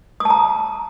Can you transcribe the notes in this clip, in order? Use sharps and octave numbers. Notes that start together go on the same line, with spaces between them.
A5 A#5 D#6